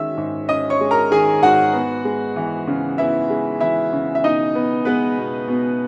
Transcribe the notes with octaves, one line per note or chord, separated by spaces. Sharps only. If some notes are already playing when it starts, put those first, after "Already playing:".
Already playing: D#3 G#3 C#4 E5 E6
G#2
C#4 D#5 D#6
C#5 C#6
G#3
A#4 A#5
D#3 G#4 G#5
G#2 F#4 F#5
B3
G#3
E3
C#3
B3 E4 E5
G#3
E3 E4 E5
C#3
E5
B2 D#4 D#5
B3
G#3 B3 B4
B2
B2